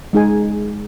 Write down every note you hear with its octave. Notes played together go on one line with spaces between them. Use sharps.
G#3 D#4 G#4 G#5